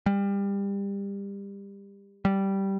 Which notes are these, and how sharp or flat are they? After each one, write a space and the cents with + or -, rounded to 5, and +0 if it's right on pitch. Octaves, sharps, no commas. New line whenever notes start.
G3 +25
G3 -10